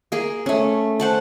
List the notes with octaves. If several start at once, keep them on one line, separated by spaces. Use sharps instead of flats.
A#3 G#4
A3 C#4
C5 F#5 A5